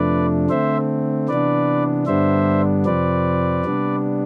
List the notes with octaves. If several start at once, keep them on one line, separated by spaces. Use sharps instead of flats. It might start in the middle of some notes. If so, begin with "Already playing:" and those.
Already playing: F2 C3 F3 A3 D4 B4 D5
D3 A3 C4 C5 E5
C3 E3 B3 D4 B4 D5
G2 D3 G3 B3 D4 C5 E5
F2 C3 F3 C4 B4 D5
C3 G3 B3 D4